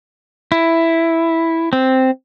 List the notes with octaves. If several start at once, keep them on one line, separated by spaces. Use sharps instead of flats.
E4
C4